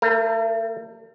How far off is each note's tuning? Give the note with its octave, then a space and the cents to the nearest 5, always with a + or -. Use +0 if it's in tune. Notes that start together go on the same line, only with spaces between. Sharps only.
A3 +40 A#4 +0